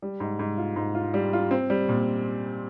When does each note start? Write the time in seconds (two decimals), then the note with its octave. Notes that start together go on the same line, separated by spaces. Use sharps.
0.02 G3
0.20 G#2
0.39 G#2
0.58 F4
0.76 G#2
0.95 F4
1.14 G3
1.33 F4
1.51 C4
1.70 G3
1.88 A#2